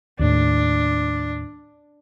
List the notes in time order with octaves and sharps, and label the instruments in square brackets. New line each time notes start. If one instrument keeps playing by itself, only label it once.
[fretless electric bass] D#2 A2 [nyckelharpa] D4